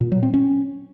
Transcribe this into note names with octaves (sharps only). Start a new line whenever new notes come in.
A#2
F#3
C4
C#4